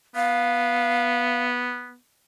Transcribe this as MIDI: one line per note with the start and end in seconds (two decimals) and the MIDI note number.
0.16 1.95 59
0.16 1.45 77